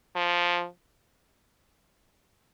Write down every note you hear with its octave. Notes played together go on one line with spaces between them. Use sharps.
F3